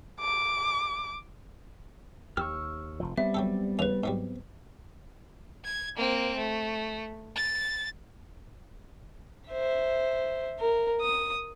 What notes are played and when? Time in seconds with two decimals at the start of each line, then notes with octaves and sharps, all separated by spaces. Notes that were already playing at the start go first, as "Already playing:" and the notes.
0.21 D6
2.37 D#2 G4 C#6 E6 F6
3.00 F1 F3
3.18 G3 B3 C4 E5
3.34 F#3 G4 A4
3.79 D#2 C#3 B4 F7
4.04 G#2 F#3 G3
5.64 G#6
5.96 A#3 C4
6.37 A3
7.36 A6
9.49 C5 E5
10.60 A#4
11.01 D#6